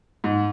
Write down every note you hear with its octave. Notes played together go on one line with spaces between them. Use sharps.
G#2